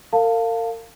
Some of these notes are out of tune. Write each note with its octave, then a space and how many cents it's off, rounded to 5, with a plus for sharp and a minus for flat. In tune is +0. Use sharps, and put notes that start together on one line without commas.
A#4 -40 F5 +0 A5 +25